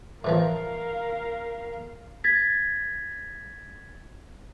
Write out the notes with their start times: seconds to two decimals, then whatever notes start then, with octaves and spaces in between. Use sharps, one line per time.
0.24 A2 E3 F3 A#4 F5
2.24 G#6 A6 B6